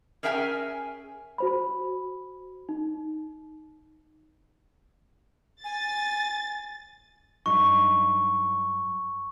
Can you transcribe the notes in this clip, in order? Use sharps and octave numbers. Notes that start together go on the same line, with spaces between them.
C#4 G#4 A#4 E5 G5 G#5
F#4 C5 B5
D#4
G#5 A6
G2 F#3 D#4 C#6